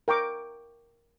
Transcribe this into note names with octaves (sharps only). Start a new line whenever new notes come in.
A#4 G5 C#6 D6